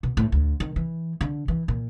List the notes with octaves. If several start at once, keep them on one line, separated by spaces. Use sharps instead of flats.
B2
A2
D2
D#3
E3
D3
E3
A#2